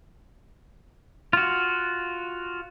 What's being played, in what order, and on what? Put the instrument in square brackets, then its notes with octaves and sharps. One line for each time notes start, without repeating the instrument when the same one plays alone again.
[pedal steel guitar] F4 F#4